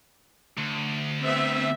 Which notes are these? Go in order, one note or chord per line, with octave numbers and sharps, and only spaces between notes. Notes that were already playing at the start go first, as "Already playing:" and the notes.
D2
B3 C4 E5